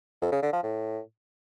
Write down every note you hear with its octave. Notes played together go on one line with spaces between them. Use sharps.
F2
C#3
D3
F3
A2